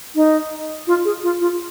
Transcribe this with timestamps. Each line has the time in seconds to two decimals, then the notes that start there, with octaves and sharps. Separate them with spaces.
0.15 D#4
0.87 F4
1.05 G#4
1.23 F4
1.41 F4